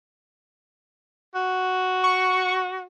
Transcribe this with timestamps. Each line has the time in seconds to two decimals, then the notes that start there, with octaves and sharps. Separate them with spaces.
1.35 F#4
2.04 C#6